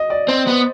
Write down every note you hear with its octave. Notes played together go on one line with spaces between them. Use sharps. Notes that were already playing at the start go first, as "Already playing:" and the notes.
Already playing: D#5
D5
C4 C5
B3